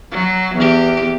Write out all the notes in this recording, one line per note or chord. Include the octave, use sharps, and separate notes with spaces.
F#3
E2 G4